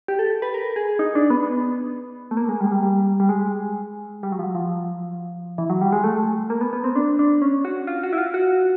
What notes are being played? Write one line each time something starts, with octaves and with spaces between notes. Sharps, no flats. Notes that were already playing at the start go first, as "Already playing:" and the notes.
G4
A4
B4
A#4
G#4
D#4
D4
B3
A3
A#3
G#3
G3
G#3
G3
G3
G3
G#3
G3
F#3
F3
F#3
F3
E3
F#3
G3
G#3
A3
A#3
B3
B3
C4
D4
D4
C#4
F#4
F4
F#4
E4
F4
F#4